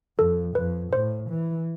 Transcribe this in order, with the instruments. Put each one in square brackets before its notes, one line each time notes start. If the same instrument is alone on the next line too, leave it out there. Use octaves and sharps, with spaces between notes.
[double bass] F2 [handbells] A4
[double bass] F2 [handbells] B4
[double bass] A2 [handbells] C5
[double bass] E3